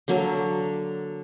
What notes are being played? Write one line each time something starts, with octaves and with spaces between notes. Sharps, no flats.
D3 F#3 A#3